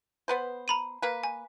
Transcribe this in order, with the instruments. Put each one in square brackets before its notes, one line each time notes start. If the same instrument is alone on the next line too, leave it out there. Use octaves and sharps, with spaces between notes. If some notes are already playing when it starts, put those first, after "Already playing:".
[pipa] B3 B4 C5
[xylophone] A#5 B5 D#7
[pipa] A#3 B4
[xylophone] G#5